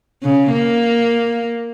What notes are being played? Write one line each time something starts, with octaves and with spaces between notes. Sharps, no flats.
C#3
A#3